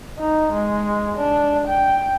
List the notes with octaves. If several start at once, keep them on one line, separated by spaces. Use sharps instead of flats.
D#4
G#3
D4
G5